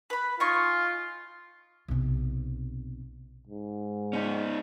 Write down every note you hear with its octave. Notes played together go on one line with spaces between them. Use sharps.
B4 B5
D#4 F4 G#5 C#6
B1 C3
G#2
C#4 D#4